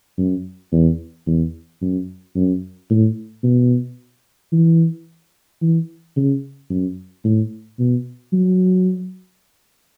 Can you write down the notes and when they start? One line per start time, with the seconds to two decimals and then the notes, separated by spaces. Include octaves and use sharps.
0.18 F#2
0.72 E2
1.27 E2
1.82 F#2
2.36 F#2
2.90 A2
3.44 B2
4.53 E3
5.62 E3
6.17 C#3
6.70 F#2
7.25 A2
7.79 B2
8.33 F#3